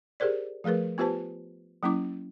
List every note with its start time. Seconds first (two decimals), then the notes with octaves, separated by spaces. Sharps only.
0.20 G4 G#4 A#4 C5 D5
0.64 F3 A3 G#4 A#4 B4
0.98 B3 F4 G4 B4 C5 A5
1.83 F#3 A#3 C#4 E4 D6